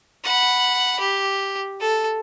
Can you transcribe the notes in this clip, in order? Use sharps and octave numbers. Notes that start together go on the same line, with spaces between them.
F#5 B5
G4
A4